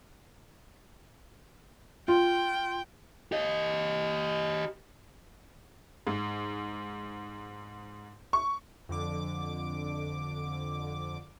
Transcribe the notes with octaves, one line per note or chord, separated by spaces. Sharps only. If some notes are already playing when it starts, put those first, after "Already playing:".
F4 G5
G4 D#5
G#2
C#6
F2 D3 D6